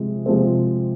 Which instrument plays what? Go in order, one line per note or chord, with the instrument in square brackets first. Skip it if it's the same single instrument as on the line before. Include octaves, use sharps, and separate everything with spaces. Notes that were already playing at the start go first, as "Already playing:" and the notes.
Already playing: [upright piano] C3 F3 G#3 C4
C3 F3 G#3 C4